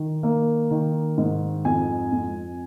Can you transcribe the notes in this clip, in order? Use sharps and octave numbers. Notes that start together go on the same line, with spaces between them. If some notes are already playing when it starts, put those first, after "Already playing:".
Already playing: D#3
A#3
D#3
G#2
F2 G#5
F2